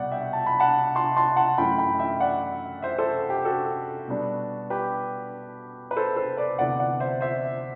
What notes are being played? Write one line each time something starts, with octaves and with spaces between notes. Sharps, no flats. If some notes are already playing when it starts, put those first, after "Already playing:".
Already playing: C2 B2 G3 D5 F#5
E5 G5
A5
B5
F#5 A5
A5 C6
A5 C6
F#5 A5
F#2 E3 A3 G5 B5
G5 B5
E5 G5
D5 F#5
C5 E5
A4 C5
G4
F#4 A4
B2 G3 B3 D4
G4 B4
B4
A4 C5
A4 C5
B4 D5
D2 C3 E3 B3 D4 D5 F#5
D5 F#5
C5 E5
C5 E5